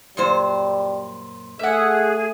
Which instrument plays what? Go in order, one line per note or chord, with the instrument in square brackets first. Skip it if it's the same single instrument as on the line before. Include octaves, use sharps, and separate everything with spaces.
[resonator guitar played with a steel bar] F#2 A#2 C5 [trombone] G3
[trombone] A3 [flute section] G#4 [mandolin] E5 F#5